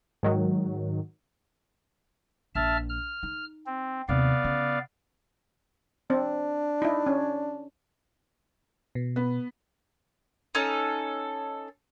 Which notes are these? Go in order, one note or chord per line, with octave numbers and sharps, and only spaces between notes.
G#2 D#3 F#3
A#1 E5 A5 F6
F6
D#4
C4
D#2 C3 B3 D5 F5
C#3
C4 D4
D#4 E4
C#4
B2
B3
C#4 D#4 A4